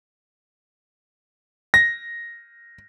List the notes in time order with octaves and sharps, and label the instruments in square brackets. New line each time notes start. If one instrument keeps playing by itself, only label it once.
[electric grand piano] A#6